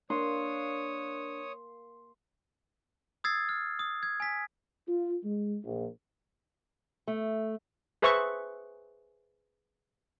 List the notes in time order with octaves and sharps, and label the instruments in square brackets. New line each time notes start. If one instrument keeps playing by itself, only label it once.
[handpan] A#3 [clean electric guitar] D4 [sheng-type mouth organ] C#5 D#6 [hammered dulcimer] C6
[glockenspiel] D#6 E6 G#6 A6 C7
F6
D#6
G#6
G#5 B6
[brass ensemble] F4
G#3
A#1
[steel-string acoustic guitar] A3
[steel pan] G#4 B4 C5 E5 C#6